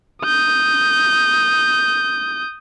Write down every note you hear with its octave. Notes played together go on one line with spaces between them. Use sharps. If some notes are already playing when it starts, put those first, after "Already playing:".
D#6 G6